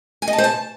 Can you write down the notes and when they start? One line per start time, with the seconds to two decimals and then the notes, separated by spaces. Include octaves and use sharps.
0.22 G#5
0.28 D#5
0.33 A5
0.38 C5
0.44 A5